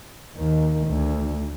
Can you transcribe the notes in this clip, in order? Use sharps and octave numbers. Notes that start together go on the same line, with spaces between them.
D#2 D#3
D2